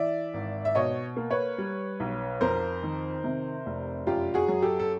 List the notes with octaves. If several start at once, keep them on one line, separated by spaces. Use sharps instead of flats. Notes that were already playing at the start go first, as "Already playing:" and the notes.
Already playing: E3 D5 E5
G#1
E5
B2 C#5 D#5
A#3
B4 C#5
G3
B1
F2 A#4 C5
D#3
C3
F1
F#2 F4 G4
F#4 G#4
F#3
G4 A4
A4